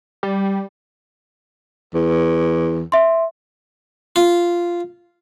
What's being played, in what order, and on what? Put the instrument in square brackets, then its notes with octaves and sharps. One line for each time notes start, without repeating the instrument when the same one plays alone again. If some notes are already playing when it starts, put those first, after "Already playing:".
[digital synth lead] G3
[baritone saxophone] E2
[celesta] E5 C6
[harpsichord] F4